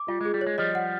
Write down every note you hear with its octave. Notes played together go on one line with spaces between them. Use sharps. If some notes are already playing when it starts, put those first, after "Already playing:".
Already playing: D6
G3 F4
G#3 G#4
G3
C#5
G#3
F3 G3 D#5
F#5